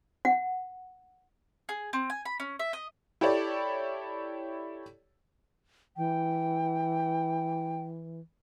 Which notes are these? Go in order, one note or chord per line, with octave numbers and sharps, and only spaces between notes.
F#5
G#4
C4
G#5
B5
C#4
E5
D#5
E4 G4 A4 C#5 D5
E3 G5